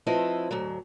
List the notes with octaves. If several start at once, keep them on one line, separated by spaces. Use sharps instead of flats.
F3 C4 E4 B4 D#5
D2 G#2 F#3